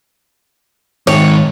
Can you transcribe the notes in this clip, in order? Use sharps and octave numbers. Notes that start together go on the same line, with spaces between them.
G#2 D#3 C#5